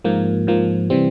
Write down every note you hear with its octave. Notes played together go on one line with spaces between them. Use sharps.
G#2 F3 A#3
G#2 F3 A#3
C3 E3 G3 C4